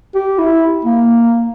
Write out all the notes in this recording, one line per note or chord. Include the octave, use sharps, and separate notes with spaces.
G4
E4
A#3